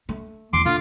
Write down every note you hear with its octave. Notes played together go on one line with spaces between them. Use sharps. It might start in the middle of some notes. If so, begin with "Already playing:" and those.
A3
E2 C6 D6
D3 F4